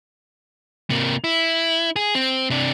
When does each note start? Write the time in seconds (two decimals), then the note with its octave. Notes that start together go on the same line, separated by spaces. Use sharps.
0.90 C3 A#3
1.24 E4
1.96 G#4
2.15 C4
2.50 C3 D4